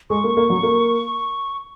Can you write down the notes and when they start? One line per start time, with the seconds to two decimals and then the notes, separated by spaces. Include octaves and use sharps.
0.10 G#3 C#6
0.24 A#3
0.37 A#3
0.50 F#3
0.63 A#3